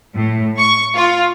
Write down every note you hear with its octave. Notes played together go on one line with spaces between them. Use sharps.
A2
C#6
F4